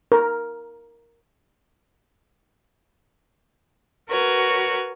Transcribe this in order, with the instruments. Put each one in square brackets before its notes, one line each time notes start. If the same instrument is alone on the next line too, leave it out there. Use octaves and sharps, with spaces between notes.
[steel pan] A#4
[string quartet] F#4 A#4 B4 C#5